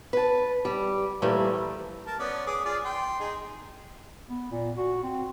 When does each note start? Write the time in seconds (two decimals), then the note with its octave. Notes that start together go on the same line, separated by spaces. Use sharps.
0.13 B4 A5
0.65 G3
1.22 G2 A#2 E3 F3 G3 A3
2.07 A#4 A5
2.19 B3 C#4 D5
2.47 G#4 D6 D#6
2.65 F4 G#4 D5
2.85 G5 C6
3.20 D#4 G#4
4.30 B3
4.52 A#2
4.77 F#4
5.03 C4